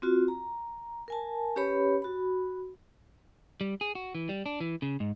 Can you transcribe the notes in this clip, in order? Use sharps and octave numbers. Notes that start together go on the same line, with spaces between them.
C4 F4 F#4
A#5
A#4 G#5 A5
C#4 G4 B4 C#5 B5
F#4 B5
G3
G#4
F#4
E3
G3
D4
E3
C#3
G#2